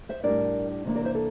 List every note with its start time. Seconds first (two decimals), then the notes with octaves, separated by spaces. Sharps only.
0.09 C5 E5
0.24 A2 G3 D4 A#4 D5
0.85 C3 E3 G3 A#3 D4
0.95 A#4 D5
1.05 C5 E5
1.15 A4